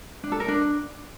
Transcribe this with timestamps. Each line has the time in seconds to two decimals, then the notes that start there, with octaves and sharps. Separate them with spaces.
0.24 D4
0.32 A4
0.40 A#4
0.48 D4